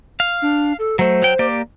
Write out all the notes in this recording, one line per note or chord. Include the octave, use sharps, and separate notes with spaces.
F5
D4
A4
F#3 A3 C5
F#3 G5
A#3 G4 D5